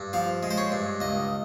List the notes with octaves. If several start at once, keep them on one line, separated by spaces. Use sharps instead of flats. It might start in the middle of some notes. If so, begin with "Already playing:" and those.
Already playing: G2
F3 F5
G#3
C5
C#5
G2
C#2 D#5